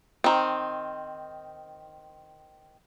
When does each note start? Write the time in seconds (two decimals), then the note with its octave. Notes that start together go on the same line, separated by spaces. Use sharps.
0.24 D#3 C4